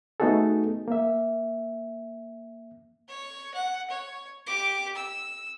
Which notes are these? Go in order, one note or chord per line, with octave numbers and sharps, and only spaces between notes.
A3 B3 D#4 F#4 G#4 A4
A#3 E5
C#5
F#5
C#5
G4 D6
E6